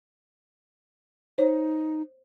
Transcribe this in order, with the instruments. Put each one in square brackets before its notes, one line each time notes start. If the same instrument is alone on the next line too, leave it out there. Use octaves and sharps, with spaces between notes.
[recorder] D#4 [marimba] C5 C#5